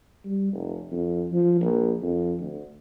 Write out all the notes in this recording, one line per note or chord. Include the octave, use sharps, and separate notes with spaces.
G3
F1
F2
F3
A#1
F2
D2